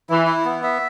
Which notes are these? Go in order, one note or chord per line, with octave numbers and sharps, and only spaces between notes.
E3 E4
E4
B3
E5